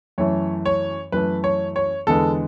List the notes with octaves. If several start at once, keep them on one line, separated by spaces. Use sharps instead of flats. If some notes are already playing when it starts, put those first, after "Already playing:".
F#2 E3 A3 C#5
C#5
F#2 E3 A3 B4
C#5
C#5
E2 D3 G#3 B3 A4